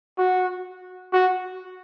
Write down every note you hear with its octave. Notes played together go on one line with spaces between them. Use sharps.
F#4
F#4